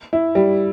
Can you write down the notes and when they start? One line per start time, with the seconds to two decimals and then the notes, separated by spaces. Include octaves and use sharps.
0.13 E4
0.35 G3